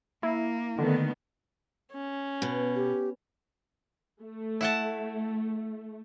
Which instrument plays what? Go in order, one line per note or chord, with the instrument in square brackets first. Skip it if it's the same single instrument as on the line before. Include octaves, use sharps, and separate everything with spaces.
[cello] A#3 [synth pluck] E4
[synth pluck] D3 [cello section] D#3 A3 B3
[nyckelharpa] C#4
[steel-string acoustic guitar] B2
[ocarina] G4
[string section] A3
[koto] E4 F#5 A5